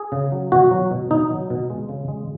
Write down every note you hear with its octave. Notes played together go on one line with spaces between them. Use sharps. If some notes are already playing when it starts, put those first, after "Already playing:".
Already playing: G#4
C#3
F#3
B2 F#4
F#3
B2
B2 D#4
F#3
B2
G#3
C#3
G#3